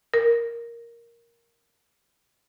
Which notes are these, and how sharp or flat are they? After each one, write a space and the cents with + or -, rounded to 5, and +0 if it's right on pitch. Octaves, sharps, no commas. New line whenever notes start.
A#4 +5